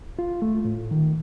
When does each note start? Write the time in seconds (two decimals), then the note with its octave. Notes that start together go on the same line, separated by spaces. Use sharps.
0.19 F4
0.42 A3
0.65 A2
0.91 D#3